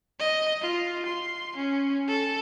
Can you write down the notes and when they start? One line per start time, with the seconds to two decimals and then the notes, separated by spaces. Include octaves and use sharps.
0.19 D#5
0.62 F4
1.06 C6
1.57 C#4
2.08 A4